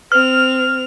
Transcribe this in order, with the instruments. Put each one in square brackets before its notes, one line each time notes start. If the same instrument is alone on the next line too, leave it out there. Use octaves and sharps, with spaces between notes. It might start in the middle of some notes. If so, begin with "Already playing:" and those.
[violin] C4 F7 [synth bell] F6